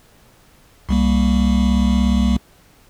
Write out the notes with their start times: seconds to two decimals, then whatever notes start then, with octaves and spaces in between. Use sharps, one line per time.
0.89 C2 G3 A#3